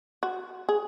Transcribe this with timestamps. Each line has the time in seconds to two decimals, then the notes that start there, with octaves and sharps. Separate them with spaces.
0.23 F#4
0.69 G#4